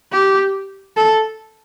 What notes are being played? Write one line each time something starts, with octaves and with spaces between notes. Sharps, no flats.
G4
A4